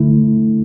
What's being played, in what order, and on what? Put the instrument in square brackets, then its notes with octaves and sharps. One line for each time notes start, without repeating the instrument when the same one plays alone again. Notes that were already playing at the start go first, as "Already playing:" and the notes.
Already playing: [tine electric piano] D3 A3 E4